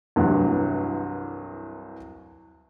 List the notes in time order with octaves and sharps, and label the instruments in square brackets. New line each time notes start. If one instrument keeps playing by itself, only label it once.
[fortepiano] C2 G2 E3 F#3